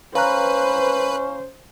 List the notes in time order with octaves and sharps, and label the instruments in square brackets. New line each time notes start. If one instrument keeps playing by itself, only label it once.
[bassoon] C#4 [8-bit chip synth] B4 [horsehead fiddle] C5 [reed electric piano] F5 A#5 F#6